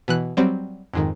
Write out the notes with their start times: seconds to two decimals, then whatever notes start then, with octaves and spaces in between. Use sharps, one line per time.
0.08 B2 E3 F#6
0.37 F#3 G3 C4
0.94 F2 G#2 D#3